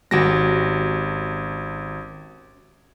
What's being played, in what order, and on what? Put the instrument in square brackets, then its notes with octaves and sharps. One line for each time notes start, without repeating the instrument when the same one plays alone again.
[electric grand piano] G#1 A#6 [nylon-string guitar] C#4 F#4 G4